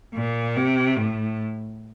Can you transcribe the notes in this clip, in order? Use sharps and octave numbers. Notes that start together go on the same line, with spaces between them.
A#2
C3
A2